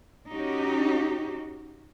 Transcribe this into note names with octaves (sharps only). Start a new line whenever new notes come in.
C#4 D#4 F#4 G4